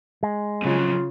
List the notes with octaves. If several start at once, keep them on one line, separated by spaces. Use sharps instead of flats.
G#3
F2 C#3 F#3 F4